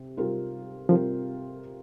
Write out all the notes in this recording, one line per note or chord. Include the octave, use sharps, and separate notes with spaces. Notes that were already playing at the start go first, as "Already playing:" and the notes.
Already playing: C3 C4
C3 G3 C4 F4 A#4
C3 F3 G3 C4 F4 A#4